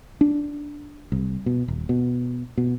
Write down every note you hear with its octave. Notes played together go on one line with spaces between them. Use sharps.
D4
C2
B2
D#1
B2
B2